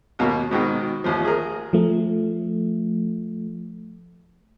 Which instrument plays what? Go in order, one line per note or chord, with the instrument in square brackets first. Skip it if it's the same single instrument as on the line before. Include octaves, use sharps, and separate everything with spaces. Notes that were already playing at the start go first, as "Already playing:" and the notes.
[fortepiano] D#2 B2 A#3
G#2 B2 D#3
A1 D#2 F3
G#4 A#4
[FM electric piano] F3 A3